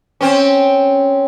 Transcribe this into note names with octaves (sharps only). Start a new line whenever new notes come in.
C4 C#4